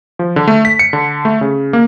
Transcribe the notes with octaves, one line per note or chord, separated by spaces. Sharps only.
F3
D3
A3
B6
C#7
D3
A3
C#3
A#3